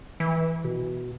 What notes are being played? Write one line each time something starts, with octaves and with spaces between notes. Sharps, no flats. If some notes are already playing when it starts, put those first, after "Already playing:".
E3
B2